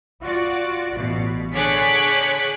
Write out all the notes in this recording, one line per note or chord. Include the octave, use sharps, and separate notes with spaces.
F4 F#4 D5
A1 B2
D3 G#4 C#5 D6 F#6 B6